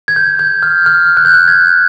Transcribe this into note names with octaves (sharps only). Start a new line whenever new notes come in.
G#6
G6
G6
F6
F6
F#6
G6
F#6
G#6